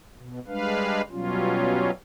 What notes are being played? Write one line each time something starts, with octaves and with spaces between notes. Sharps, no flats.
B2
G3 G#3 D4 B4 F5
B2 F#3 G3 C#4 F4